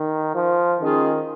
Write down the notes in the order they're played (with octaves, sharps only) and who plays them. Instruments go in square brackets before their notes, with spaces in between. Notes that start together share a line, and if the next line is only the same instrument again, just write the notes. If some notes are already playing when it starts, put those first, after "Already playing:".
Already playing: [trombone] D#3
F3
[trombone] D#3 [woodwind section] G#3 C#4 F4 G#4